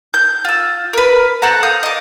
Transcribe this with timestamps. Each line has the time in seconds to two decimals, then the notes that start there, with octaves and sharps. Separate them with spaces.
0.14 G6
0.45 F4 E6
0.93 A#4 B4
1.42 C4 A4 F#5 A#5
1.63 F5 D#6 G6
1.83 D#5 D6